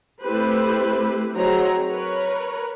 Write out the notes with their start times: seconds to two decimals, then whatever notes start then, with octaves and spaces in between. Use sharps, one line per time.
0.21 A3 C4 E4 G4 B4 C5
1.33 F#3 C4 D#4 G#4 C#5 A#5
1.88 A#4 B4 C#5